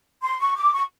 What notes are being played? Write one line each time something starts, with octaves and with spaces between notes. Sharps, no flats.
C6
C#6
D6
C#6